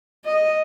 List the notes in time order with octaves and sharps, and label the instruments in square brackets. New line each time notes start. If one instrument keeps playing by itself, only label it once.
[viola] D#5